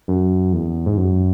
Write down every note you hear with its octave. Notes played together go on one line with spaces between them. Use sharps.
F#2
E2
G#2
F#2